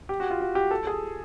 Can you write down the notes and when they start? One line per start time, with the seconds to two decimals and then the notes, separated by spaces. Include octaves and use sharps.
0.09 G4
0.20 F#4
0.30 F4
0.41 F#4
0.55 G4
0.71 A4
0.87 G#4